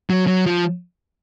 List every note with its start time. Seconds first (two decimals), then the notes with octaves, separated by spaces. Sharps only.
0.10 F#3
0.27 F#3
0.46 F3